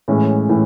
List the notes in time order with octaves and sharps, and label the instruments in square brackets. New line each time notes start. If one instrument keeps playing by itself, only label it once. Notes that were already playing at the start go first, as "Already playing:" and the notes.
[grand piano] A2 E3 G#3 C#4
A2 E3